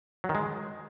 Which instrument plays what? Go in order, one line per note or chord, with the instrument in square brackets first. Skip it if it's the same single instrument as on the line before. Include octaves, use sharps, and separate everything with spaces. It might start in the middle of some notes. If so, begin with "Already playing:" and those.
[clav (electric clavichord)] F#3
D#3
G#3